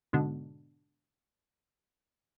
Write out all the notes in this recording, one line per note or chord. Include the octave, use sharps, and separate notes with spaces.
G#2 B2 D3